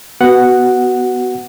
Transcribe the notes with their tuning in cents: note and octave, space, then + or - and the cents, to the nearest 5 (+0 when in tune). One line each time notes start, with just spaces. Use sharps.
B3 +5 F#4 +15 F#5 +0